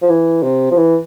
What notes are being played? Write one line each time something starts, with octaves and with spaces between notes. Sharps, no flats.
F3
E3
C3
F3
E3